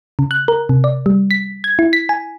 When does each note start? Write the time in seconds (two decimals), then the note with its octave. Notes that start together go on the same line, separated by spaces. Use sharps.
0.19 C#3
0.31 F#6
0.48 A#4
0.69 C3
0.84 D5
1.06 G3
1.31 B6
1.64 G#6
1.79 E4
1.93 B6
2.09 G#5